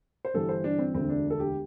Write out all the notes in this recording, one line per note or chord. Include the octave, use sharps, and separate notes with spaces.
C5
G1 G2 E3 G3 A4
C5
D4
C4
E1 D2 D3 C4
D4
A4
G4